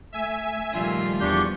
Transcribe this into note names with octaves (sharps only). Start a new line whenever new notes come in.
A3 E5 G#5
A#2 D#3 F3 G3 A3 F4
E2 F3 D4 G4 C#6 G6